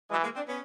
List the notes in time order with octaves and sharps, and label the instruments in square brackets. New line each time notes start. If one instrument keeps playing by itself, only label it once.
[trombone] E3 [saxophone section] F#3 G#3
[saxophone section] G#3 A#3
C4 D4
B3 C#4